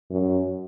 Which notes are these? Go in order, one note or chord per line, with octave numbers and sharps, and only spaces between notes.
F#2